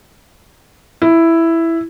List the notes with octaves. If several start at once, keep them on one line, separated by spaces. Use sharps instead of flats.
E4